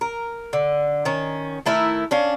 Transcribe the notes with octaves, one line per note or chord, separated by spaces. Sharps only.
A#4
D3
D#3 C#4
D#3 A3 E4 A#4
C#4 D4 F5